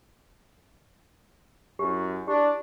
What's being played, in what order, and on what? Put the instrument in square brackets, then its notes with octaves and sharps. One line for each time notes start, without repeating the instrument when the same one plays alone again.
[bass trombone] F#2 [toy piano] E4 G4
[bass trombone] D4 [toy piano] G4